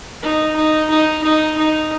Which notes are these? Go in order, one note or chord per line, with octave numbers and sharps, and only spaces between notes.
D#4
D#4
D#4
D#4
D#4